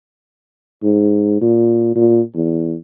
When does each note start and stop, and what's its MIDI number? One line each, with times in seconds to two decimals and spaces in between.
0.83 1.39 44
1.41 1.93 46
1.95 2.21 46
2.35 2.74 40